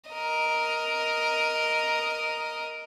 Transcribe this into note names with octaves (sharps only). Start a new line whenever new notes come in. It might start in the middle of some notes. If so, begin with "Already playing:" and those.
A#4 D#5